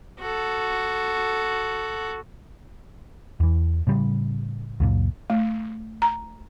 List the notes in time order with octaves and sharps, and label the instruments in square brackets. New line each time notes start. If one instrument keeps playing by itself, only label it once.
[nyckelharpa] F#4 A4
[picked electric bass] E2 E3
A2 C#3 G3
C#2 F#2 A#2
[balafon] A3
A#5